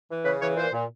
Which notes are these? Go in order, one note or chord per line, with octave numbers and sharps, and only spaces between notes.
E3
C#3 B4
E3 C#5
A#2 C5
A#2